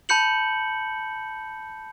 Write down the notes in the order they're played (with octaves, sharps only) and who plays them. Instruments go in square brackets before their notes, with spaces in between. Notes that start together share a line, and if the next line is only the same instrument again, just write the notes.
[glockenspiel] A5 B5 G6 C#7 F#7